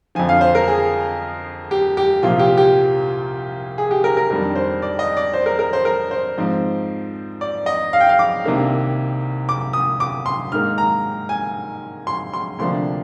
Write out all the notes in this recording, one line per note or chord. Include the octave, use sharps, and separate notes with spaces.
F2 D3 F3 G#5
F5
C5
A#4
G#4
G4
G4
C2 A#2 F3 F4
G4
G4
G#4
G4
A#4
A#4
F2 D#3 G3 D4 A#4
C5
D5
D#5
D5
C5
A#4
A#4
C5
A#4
C5
G#2 F3 C4
D5
D#5
F5
G5
F5
D6
C2 C3 D#3 A#3 D4
D6
D#6
D6
C6
G#2 D#3 A#3 F6
A#5
G#5
C6
C6
D2 C3 F3 A#3 D4 C6